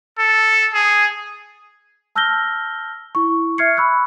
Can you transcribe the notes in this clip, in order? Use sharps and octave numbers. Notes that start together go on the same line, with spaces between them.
A4
G#4
A5 E6 F6 G6 A#6 G7
E4 C#6
E5 C#6 F6 G#6 C7 C#7
B5 C#6 E6 F#6